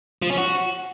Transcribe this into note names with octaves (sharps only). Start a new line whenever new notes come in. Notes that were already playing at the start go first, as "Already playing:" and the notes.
F3
C#4
F#4